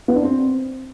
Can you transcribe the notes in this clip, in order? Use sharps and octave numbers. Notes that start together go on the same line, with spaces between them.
B3
D4
C4